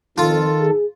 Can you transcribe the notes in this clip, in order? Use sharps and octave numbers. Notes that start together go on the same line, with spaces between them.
F2 D#3 F4 A4
G#4